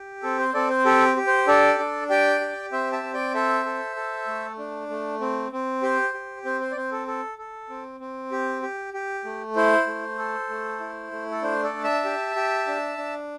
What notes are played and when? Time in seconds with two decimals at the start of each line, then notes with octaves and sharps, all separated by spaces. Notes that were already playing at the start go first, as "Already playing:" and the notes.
Already playing: G4
0.23 C4 A4
0.39 C5
0.54 C4 A4 D5
0.70 C5
0.85 G4 A4
1.17 G4
1.27 C5
1.47 D4 A4 D5
1.79 D4
2.10 G4 D5 G5
2.40 G4
2.72 C4 C5 E5
2.92 E5 A5
3.03 C4
3.14 D5 G5
3.34 A4 C5 E5
3.65 A4
3.96 A4
4.27 A3
4.58 D4
4.89 A3
5.20 C4
5.52 C4
5.82 G4 C5
6.14 G4
6.45 C4 C5
6.61 C5
6.71 D5
6.76 C4 C5
6.91 A4
7.07 A4
7.38 A4
7.70 C4
8.00 C4
8.32 G4
8.62 G4
8.94 G4
9.25 A3
9.56 E4 C5
9.87 A3
10.18 A4
10.49 A3
10.80 E4
11.12 A3
11.31 A4
11.42 D4 C5
11.64 A4 D5
11.73 D4
11.84 E5 A5
12.05 G4
12.36 G4
12.67 D4
12.98 D4